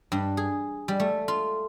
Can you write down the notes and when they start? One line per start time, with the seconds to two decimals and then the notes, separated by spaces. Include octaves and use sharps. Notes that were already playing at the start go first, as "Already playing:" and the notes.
0.12 G2
0.37 G#4
0.88 G3
1.00 A3
1.28 F4